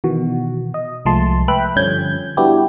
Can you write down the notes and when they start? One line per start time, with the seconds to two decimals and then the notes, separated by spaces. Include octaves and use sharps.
0.04 B2 D#3 E3 F#4
0.74 D#5
1.05 C2 F3 G#3 A3 A5 C6
1.48 B4 E5 G5 F#6
1.76 G2 D3 F3 C#4 G6 G#6
2.37 G3 B3 D4 E4 F#4 G4